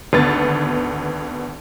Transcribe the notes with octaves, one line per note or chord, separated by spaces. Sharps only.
G#1 D2 B3 A6